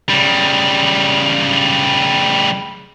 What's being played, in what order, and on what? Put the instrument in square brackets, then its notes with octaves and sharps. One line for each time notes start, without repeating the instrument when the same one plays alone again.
[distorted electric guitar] C#3 G3